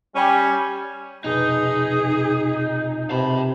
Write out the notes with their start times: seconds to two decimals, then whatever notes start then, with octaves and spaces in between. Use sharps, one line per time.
0.14 G3 C#4
1.24 F1 B2 B3 D#4 G#4
3.11 C3 A#4 A5 B5